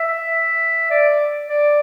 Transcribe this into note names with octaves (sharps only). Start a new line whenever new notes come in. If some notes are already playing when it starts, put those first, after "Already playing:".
Already playing: E5
D5
D5